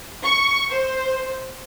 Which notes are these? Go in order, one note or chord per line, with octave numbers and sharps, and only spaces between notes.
C#6
C5